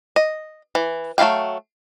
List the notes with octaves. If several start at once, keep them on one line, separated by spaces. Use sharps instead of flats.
D#5
E3
F#3 A3 E4 F5 G5